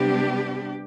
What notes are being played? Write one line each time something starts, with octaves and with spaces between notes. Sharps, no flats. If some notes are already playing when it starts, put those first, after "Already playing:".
Already playing: C3 G3 B3 D4 G4